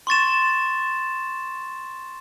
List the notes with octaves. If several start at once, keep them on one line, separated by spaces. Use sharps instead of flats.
C6 C#6 A6 E7